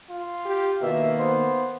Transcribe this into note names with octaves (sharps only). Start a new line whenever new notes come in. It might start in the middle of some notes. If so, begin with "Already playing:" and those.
F4
G4
B2 D#3 A#3 E5
B3 C5